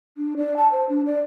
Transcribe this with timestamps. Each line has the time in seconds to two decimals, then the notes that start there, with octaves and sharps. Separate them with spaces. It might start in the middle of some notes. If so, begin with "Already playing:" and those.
0.17 D4
0.37 D5
0.57 A5
0.72 C5
0.89 D4
1.06 D5